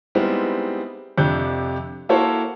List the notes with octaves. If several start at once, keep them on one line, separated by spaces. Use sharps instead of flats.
G3 G#3 B3 C4 D#4 E4
F2 C3 D4 F#6 G6 C#7
A#3 E4 F#4 A4 C5 C#5